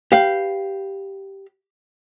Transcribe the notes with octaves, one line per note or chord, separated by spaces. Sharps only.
G4 B4 F5